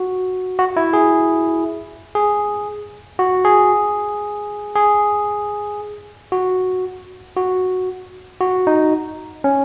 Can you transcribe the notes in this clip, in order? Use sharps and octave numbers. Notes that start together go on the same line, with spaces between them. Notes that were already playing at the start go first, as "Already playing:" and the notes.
Already playing: F#4
F#4
E4
G#4
G#4
F#4
G#4
G#4
F#4
F#4
F#4
D#4
C#4